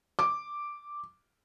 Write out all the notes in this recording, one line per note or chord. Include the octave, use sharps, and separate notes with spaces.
D6